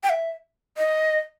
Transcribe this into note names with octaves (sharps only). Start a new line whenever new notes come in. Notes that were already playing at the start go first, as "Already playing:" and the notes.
G5
E5
D#5